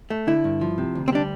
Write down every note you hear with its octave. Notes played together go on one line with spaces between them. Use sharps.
A3
D3 E4
G2
F3
C3
D2
C4
G3 D4